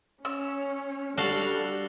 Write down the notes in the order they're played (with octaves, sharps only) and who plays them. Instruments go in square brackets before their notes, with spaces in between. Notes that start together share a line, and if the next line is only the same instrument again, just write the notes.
[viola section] C#4 [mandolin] E6
[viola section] G3 [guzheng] D4 F#4 F5 [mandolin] A4